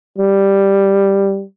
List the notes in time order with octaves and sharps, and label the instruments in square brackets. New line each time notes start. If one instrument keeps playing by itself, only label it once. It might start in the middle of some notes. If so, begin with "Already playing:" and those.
[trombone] G3